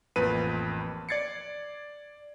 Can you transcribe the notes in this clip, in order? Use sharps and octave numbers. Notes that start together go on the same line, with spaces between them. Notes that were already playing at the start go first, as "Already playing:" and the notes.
A1 F2 A#3 B4 D#7
D5 G#6 A6 C7 C#7